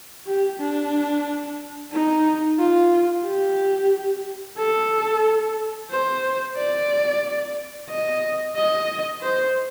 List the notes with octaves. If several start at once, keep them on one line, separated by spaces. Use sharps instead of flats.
G4
D4
D#4
F4
G4
A4
C5
D5
D#5
D#5
C5